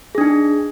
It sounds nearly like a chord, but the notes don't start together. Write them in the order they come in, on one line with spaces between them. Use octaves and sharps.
G#4 D4 D#4